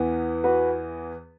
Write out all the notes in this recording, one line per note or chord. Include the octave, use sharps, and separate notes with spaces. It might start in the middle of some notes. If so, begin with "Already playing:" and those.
Already playing: E2 E3 B3
F#4 B4